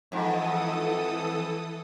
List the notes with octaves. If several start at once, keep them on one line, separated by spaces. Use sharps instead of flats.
F2 G#2 E3 A4 D#6